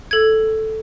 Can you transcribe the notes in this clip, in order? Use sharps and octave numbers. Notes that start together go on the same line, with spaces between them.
A4 G#6